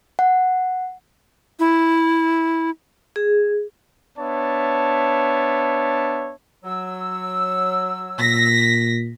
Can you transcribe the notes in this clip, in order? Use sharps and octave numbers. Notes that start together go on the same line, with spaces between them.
F#5
E4
G#4
B3 D4 C#5 E5 A5
F#3 E6
A#2 A#6 B6